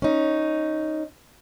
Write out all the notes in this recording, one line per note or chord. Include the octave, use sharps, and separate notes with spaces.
C#4 D#4